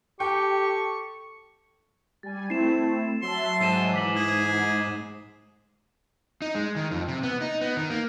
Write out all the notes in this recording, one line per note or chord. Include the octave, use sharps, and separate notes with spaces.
G4 A4 G5 C#6
G3 G#5 A6
A3 C4 E4 C7 E7
F#3 E5 A5 C6
G#2 C7 D#7 E7
E3 D6 B6 F#7
G#4
D#4
G#3
D#3
F2
C3
B3
D#4
B3
D#3
A#3